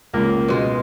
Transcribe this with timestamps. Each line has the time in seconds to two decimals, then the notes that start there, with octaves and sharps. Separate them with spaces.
0.14 C#2 A#3
0.48 B2 G#3